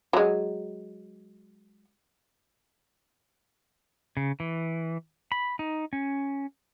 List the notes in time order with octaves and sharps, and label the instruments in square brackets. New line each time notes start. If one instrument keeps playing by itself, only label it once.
[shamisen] F#3 G#3
[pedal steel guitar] C#3
E3
B5
D#4
C#4